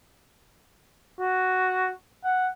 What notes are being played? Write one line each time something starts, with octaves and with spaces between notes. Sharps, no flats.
F#4
F#5